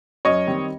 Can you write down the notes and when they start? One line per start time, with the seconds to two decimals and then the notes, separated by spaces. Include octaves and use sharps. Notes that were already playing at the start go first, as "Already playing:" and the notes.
0.25 F#2 C#5 D#5
0.47 D#3 G3 C4